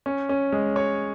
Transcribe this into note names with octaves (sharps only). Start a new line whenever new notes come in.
C#4
C#4
G#3
C#5